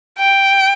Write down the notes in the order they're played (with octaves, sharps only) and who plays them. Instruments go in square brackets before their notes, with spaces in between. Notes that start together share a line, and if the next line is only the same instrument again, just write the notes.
[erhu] G5